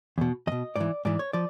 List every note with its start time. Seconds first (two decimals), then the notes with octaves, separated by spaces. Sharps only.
0.18 E2 B2
0.47 E2 B2 D#5
0.76 G#2 E3 D5
1.05 G#2 E3 D5
1.19 C#5
1.33 F3 D5